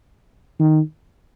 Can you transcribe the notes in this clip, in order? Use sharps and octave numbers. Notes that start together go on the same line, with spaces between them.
D#3